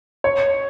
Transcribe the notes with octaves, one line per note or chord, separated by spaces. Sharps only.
C#5